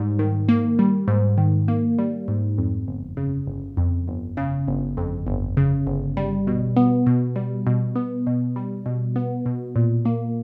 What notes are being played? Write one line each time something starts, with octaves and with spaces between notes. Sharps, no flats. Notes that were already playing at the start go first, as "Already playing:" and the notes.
Already playing: G#2 G3
D#3
A#3
G3
G#2
D#3
A#3
G3
G#2
F2
G1
C#3
G1
F2
G1
C#3
G1
F2
G1
C#3
G1
G3
B2
B3
B2
G3
B2
B3
B2
G3
B2
B3
B2
A#2
A#3